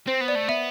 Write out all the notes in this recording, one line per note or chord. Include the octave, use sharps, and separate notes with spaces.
C4 C5
B3
D5
A3
B3 E5